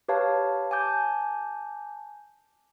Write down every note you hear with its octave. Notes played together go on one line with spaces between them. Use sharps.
G4 B4 C#5 F5 A5
G#5 A5 D6 G6